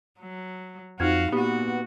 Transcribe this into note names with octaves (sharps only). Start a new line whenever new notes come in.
F#3
F2 D#4 F#4 F5 F6 G#6
A#2 B3 F#4 G4